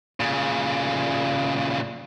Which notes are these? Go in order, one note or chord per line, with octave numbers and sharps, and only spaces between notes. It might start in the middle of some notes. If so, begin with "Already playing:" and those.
A#2 C#3